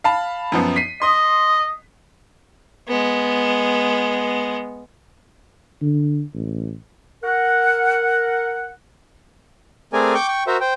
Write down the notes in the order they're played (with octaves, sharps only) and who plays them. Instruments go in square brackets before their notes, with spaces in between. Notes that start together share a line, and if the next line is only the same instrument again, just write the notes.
[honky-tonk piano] F5 A5 B5
F#2 F3 B3
B6 C7 D#7
[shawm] D#5 [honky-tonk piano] C6 D#6
[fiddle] G#3 B3
[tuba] D3
A1
[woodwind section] A#4 F#5
[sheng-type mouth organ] A3 C4 G#4 A#4 D5 G#5
G5 C#6 D6 G6
G5 C#6
F#4 A#4 C5 E5
C5 G5